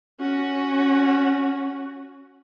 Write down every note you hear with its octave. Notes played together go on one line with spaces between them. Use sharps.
C#4 F#4